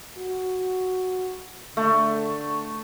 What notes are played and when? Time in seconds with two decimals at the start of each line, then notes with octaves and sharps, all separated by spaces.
0.18 F#4
1.77 D3 A3